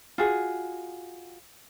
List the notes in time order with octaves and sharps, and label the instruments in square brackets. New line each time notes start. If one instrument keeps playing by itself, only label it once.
[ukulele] F4 F#4 G#4